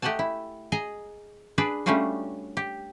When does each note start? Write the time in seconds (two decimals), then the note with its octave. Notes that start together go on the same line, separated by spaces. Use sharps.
0.02 A3 G4 D#5 F#5 G#5 A5
0.19 E4
0.72 G#4 D#5 G#5 A#5
1.58 D4 G#4 B4 D5
1.86 G3 A3 C#4 D4 F4 F#4
2.57 G4